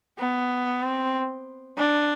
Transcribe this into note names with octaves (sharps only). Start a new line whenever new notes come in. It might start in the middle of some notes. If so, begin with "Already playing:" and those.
B3
C4
D4